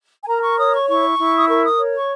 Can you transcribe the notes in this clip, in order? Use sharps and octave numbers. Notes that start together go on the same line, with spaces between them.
G#5
A#4 A#5
C#6
C#5 D#6
C#6
E4 C#6
E4
D#6
A#4 C#6
D#6
C#5
C#6